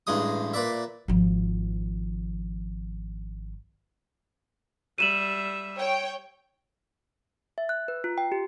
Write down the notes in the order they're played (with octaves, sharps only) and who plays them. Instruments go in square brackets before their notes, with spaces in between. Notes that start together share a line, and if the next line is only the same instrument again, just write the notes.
[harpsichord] A1 G2 G#3 D#6
A#2 B4 D5 E5
[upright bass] G#1 F3
[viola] G3 E5 [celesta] D#7 E7 F#7
[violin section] C#5 G5
[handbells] E5
F#6
B4
F4
G5
G4